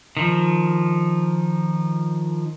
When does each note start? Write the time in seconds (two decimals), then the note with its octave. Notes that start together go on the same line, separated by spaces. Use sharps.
0.17 D#3 F3